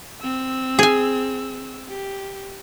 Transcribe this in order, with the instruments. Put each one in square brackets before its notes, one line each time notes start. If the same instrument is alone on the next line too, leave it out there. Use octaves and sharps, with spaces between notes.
[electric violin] C4 E6
[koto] G#4 G#5
[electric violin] G4